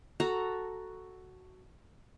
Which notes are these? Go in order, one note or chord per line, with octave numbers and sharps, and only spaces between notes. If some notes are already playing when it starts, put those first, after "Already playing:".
F#4 A4 A#5